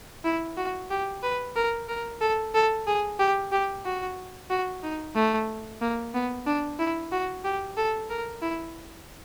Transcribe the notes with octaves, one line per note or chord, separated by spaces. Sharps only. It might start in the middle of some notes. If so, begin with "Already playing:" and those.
E4
F#4
G4
B4
A#4
A#4
A4
A4
G#4
G4
G4
F#4
F#4
D#4
A3
A#3
B3
D4
E4
F#4
G4
A4
A#4
E4